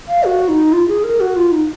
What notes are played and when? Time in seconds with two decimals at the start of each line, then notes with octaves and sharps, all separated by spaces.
0.08 F5
0.24 F#4
0.49 D#4
0.73 F4
0.88 G#4
1.04 A#4
1.20 F#4
1.36 F4
1.52 D#4